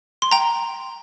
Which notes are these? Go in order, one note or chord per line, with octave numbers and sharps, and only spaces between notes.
C6
G5 A#5